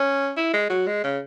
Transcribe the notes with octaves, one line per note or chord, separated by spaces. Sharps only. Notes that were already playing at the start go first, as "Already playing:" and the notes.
Already playing: C#4
E4
G#3
F#3
G#3
C#3